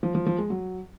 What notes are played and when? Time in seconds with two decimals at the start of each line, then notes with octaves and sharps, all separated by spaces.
0.03 F3
0.15 F3
0.26 F3
0.38 G#3
0.50 F#3